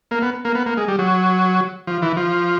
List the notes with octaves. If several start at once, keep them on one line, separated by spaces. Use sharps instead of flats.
A#3
B3
A#3
B3
A#3
G#3
G3
F#3
F3
E3
F3